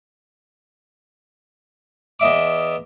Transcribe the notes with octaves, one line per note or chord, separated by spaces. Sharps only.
E2 D#5 E5 D6